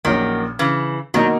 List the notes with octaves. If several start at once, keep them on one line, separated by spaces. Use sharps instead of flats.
A#1 A#2 D#3 F#3 A#3 C#4
C#3 E3
B2 D#3 F#3 A#3 D#4 A#4